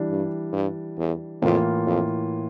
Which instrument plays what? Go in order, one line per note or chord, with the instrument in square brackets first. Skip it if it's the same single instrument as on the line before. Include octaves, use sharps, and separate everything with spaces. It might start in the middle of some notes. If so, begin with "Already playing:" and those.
Already playing: [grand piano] E3 G3 D4
[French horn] G2
G2
E2
[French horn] F2 [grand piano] A2 E3 A#3 F4
[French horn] F2